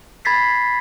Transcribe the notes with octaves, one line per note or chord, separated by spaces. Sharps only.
B5 G#6 A6 B6 C7